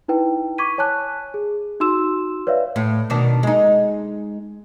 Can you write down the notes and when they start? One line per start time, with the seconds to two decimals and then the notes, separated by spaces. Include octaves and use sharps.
0.08 D#4 E4 B4 G5
0.58 C#6 D6 G#6 B6 D#7
0.78 C#5 G#5 A5 F#6
1.34 G#4
1.80 D#4 F#4 C6 E6 E7
2.47 B4 C#5 D5 E5 F5
2.76 A2
3.10 B2 D#3 D4
3.43 G#3 D#4